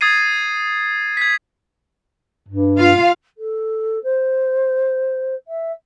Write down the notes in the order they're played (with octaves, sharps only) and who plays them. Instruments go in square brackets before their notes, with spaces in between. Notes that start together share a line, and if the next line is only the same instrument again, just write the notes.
[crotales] D#6 G#6 A6 C7 D#7
G#6 B6
[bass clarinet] G2
[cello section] F4 F5
[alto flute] A4
C5
E5